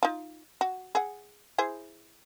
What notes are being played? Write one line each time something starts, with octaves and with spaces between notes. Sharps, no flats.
D#4 F4
F#4
G#4 F#5
E4 G#4 C5